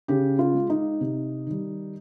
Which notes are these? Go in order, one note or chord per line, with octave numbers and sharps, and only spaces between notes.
C#3 G4
F4
G#3
D#4
C3
D#3 G3